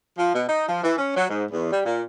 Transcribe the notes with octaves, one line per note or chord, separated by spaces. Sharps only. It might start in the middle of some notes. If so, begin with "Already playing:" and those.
F3
B2
D#4
F3
E3
C#4
F#3
G#2
E2
G3
A#2